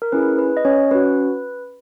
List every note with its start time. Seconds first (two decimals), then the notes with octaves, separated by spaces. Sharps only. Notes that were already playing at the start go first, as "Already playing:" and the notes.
0.02 A#4
0.12 C#4 E4 G#4 B4
0.39 B4
0.57 D#5
0.65 C#4 C#5
0.91 C#4 F#4 B4